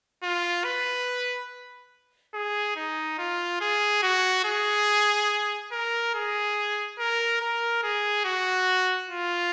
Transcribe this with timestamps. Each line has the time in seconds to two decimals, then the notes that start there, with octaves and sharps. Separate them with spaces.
0.23 F4
0.64 B4
2.34 G#4
2.76 D#4
3.18 F4
3.61 G#4
4.02 F#4
4.45 G#4
5.72 A#4
6.14 G#4
6.98 A#4
7.41 A#4
7.83 G#4
8.25 F#4
9.10 F4